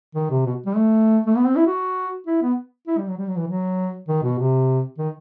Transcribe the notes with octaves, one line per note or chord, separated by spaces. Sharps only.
D#3
C3
B2
G3
A3
A3
B3
C4
E4
F#4
E4
B3
E4
G3
F#3
G3
F#3
E3
F#3
D#3
B2
C3
D#3